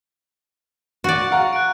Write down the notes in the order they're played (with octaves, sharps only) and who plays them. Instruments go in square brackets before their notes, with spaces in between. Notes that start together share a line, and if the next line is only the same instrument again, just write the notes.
[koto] F#4 D5 [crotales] C#6
[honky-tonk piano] F5 F#5 A#5
[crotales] F#6 D7